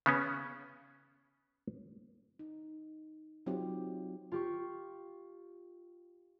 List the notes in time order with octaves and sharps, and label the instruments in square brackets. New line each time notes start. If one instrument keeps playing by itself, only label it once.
[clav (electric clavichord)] C#3 B3 C#4
[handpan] D#4
F#3 C4 D#4 F4 G4
[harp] F4 G4 C#6